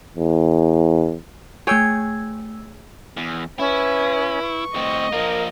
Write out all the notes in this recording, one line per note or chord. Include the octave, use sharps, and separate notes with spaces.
E2
A3 G#4 C#5 G5 E6 G#6
E2
C#4 E4 B4
C#6
A2 C4 D#5
F3 A#3 A#4